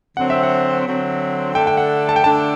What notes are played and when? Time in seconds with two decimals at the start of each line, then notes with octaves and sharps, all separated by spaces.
0.17 D3 F#3 C4 F#5
0.30 E5
0.43 F#5
0.86 D3 F#3 C4
1.55 D3 A3 D4 A4 G5
1.67 G5
1.77 F#5
2.09 A5
2.16 G5
2.23 D3 A3 D4 A4 A5